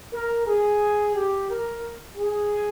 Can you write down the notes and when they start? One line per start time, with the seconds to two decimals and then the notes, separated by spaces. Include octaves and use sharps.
0.14 A#4
0.47 G#4
1.16 G4
1.49 A#4
2.17 G#4